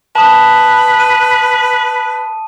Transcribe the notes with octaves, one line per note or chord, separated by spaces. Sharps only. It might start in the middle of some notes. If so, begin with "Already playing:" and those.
B4 A5 D#6
D#7